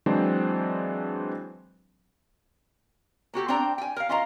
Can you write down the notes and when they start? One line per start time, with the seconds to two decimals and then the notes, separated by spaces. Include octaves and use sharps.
0.06 E3 F#3 G#3 C4 D4 C5
3.34 A#3 F#4 G4 A4
3.48 C4 D4 C5 G5 A#5
3.78 G5 G#5
3.96 A#4 F5
4.09 C#4 F4 D#5 F5 F#5 A#5